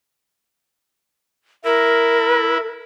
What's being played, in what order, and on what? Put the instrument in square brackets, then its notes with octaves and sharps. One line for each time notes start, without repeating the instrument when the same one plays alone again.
[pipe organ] E4 [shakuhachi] A#4